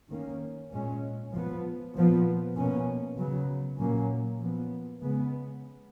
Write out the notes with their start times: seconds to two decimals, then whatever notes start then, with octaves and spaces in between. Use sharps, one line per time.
0.10 D#3 A#3 C#4
0.73 A#2 G#3 C#4
1.33 F3 B3
1.94 A#2 F3 B3
2.56 B2 A#3 C#4
3.18 C#3 F#3 B3
3.79 A#2 F#3 A#3 C#4
4.41 F3 B3
5.02 C#3 G#3 B3